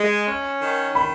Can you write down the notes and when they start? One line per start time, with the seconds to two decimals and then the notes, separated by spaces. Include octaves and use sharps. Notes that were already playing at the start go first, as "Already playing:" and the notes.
Already playing: G#3
0.27 C#4
0.62 D#3
0.95 D#3 B5